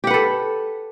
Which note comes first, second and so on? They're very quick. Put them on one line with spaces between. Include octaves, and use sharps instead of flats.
G4 F#5 B4 A4